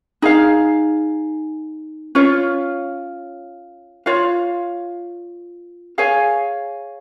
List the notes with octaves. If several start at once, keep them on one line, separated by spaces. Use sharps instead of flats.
D#4 G#4 F5
C#4 F4 C#5
F4 C#5 F5
G#4 C#5 F5 G#5